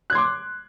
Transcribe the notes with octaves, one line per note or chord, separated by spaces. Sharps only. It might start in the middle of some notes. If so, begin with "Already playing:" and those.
C6 D6 F#6 G#6